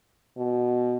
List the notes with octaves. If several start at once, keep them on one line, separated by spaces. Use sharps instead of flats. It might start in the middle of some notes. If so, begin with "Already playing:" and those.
B2